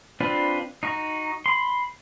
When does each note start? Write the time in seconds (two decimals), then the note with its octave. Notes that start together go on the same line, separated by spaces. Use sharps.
0.20 C4 D4 F4 B4
0.83 D#4 F#4 A#5
1.46 B5 C6